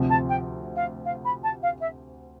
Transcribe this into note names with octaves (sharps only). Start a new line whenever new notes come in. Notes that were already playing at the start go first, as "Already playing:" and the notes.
Already playing: D2 C3 F3 C4
A5
G5
F5
F5
B5
A5
F5
E5